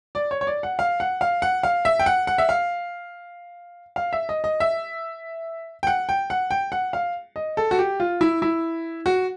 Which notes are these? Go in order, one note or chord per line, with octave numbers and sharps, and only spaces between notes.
D5
C#5
C#5
D5
F#5
F5
F#5
F5
F#5
F5
E5
G5
F#5
F#5
E5
F5
F5
E5
D#5
D#5
E5
G5
F#5
G5
F#5
G5
F#5
F5
D#5
A4
F#4
G4
F4
E4
E4
F#4